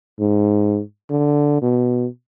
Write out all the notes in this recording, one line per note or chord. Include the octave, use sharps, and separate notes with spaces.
G#2
D3
B2